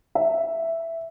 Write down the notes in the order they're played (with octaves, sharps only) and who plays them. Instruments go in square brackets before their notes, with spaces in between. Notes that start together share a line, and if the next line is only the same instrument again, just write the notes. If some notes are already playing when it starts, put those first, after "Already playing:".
[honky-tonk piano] E5